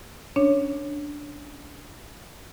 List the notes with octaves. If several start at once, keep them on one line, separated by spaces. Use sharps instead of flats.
C#4 D4 C#5